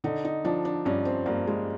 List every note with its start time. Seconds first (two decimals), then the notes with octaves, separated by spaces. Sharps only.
0.04 D3 D#4
0.25 D#4
0.44 F3 D4
0.65 D4
0.85 G2 C#4
1.05 C4
1.26 G2 A#3
1.47 G#3